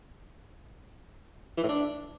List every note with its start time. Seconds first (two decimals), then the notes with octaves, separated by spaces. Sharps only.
1.57 E3
1.63 A2
1.69 D4